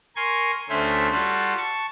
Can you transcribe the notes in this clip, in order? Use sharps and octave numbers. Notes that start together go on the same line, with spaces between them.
A#4 G#5 C6 C#6 G#6
D2 A3 C#4 C5 E5
G3 F4 F#4 A4
A5 C#6